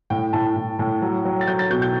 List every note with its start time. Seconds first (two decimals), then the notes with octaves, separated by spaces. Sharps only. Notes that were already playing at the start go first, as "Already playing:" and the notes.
0.10 A2 G5
0.33 A2 A5
0.56 A2
0.79 A2
1.02 F#3
1.25 F#3
1.41 A6
1.47 F#3 G6
1.59 A6
1.70 B2 G6
1.82 G6